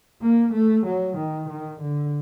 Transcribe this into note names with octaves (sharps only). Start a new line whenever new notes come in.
A#3
A3
F#3
D#3
D#3
D3